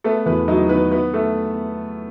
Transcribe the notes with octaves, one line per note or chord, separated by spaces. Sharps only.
A3 B3 A4
E2 B3 B4
F#3 D#4 D#5
D#3 B3 B4
B3 B4
A3 A4